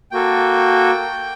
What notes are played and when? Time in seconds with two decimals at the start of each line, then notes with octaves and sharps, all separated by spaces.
0.11 A#3 F#4 A4 G5